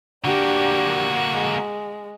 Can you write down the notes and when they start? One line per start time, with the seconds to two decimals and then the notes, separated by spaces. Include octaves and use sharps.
0.25 D3 A#3 D4 F#4 G4
1.33 G#3